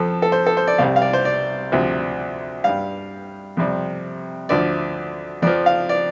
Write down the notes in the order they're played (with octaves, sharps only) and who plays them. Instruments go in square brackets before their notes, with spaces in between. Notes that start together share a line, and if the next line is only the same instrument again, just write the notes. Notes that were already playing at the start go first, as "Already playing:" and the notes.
Already playing: [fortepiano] F2 F3 A4
A4
C5
A4
C5
D5
C2 C3 G3 F5
F5
D5
C5
D5
D2 C3 F3
G2 G3 F5
F2 C3 G3
D2 D3 F3 D5
F2 F3 D5
F5
D5